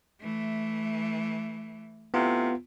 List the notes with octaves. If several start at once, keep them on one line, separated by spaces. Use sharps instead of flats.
E3 A3
A2 C3 B3 E4 F4